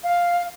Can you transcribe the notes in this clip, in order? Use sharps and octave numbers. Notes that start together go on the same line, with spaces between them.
F5